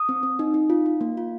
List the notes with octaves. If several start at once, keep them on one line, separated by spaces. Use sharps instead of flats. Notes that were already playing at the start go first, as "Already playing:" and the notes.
Already playing: D#6
C4
C4
D#4
D#4
F4
F4
A#3
F4